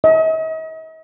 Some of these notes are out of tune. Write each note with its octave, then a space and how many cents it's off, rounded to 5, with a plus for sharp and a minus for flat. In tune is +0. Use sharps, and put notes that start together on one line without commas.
D#5 +45